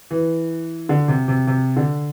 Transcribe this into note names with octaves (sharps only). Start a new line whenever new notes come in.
E3
D3
C3
C3
C3
D3